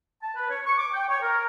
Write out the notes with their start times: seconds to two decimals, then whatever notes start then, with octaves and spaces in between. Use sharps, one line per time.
0.22 A5
0.36 B4
0.49 C#5
0.65 C#6
0.77 D6
0.93 G5
1.08 C#5
1.21 A#4